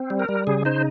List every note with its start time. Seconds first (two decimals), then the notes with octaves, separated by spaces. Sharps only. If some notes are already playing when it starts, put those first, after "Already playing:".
Already playing: C4
0.10 G3
0.19 A#4
0.29 G3
0.47 C#3 G#4
0.65 D#4 C5